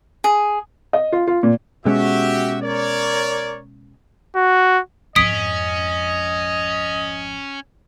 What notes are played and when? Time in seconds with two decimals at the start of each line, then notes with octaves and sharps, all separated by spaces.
0.24 G#4
0.93 D#5
1.12 F4
1.27 F4
1.43 A#2
1.85 B2 G#3 C#4 F#4 G4 E5
2.62 A#4 C#5 D5
4.36 F#4
5.16 G#1 F2 C#4 D#5 D#6 B6 D7